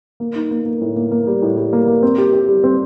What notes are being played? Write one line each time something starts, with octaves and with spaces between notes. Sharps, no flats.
A#3
D#4
A#3
A#3
A2
A#3
A#3
G3
A2
G3
A#3
A#3
C4
G4
G4
G3
C4